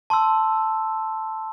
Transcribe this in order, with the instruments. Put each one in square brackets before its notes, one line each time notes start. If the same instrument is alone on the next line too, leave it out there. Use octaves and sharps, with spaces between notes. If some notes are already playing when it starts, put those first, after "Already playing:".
[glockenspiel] A5 C6 E6